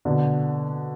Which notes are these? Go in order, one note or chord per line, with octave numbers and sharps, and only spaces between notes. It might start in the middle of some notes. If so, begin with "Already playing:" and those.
B2 D3